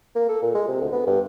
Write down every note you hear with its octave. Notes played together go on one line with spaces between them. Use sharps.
A#3
A4
A#2
G#3
C3
D2
B3
G2